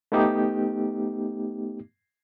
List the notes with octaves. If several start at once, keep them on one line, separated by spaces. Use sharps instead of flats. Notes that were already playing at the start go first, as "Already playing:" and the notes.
A3 B3 D#4 G4